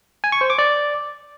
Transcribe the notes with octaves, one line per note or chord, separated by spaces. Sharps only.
G#5
C#6
C5
D6
D5